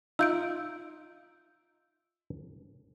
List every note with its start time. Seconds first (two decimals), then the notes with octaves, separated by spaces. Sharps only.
0.19 D#4 F4 E5 E6 G6 D7